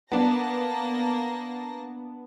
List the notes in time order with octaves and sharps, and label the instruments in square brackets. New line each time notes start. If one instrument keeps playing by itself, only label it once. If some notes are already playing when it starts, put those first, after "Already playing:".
[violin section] A#3 A5 A#6 [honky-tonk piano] B3 D4